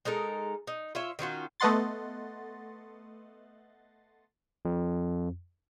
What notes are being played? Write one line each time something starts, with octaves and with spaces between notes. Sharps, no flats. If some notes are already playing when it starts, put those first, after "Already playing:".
G#3 D#4 A4 A#4
D#4
F4 C#5 E5
D#3 C#4 F4 F#4
A3 B3 D#5 F#5 C6 A6
F2